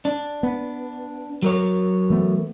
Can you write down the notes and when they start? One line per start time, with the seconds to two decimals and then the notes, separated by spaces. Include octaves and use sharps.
0.05 D4
0.43 B3
1.42 F#3 A#4 C#5
2.10 E3 A3 B3